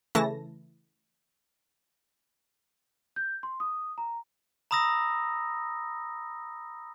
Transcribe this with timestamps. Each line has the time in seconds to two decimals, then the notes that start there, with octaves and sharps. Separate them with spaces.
0.15 C#3 E3 A3 E4 A5 A#6
3.16 G6
3.43 C6
3.60 D#6
3.98 A#5
4.71 A#5 B5 D#6 E6 A#6